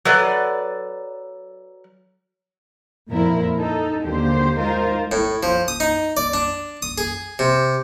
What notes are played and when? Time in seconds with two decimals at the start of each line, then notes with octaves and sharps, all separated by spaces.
0.05 F#3 A4 B4 D5
3.09 F2 A#2 E4 A#4
3.58 D#4 A4
4.04 D#2 D3 F#3 A#3 G4 C5
4.56 G#3 D#4 F4 A#4 C5
5.12 A2
5.43 F3
5.68 D#6
5.80 D#4
6.17 D5
6.34 D4
6.82 D#6
6.98 G#4
7.39 C3